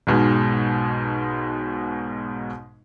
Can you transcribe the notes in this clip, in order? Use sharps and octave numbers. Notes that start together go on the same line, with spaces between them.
B1 G#2 B2 G#3